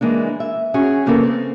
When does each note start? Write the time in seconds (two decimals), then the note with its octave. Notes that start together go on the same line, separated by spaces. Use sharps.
0.01 E3 G#3 A#3 D4
0.40 E5
0.74 C#4 F#4 G#4 C#5
1.06 F2 C#3 A#3 B3 A4 A#4
1.23 C4